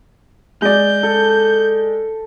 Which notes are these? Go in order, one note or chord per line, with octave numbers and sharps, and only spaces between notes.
G#3 D5 G6
A4